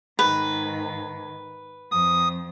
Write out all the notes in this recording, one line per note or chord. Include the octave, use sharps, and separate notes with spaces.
G#2 D#3 B4
F2 D#6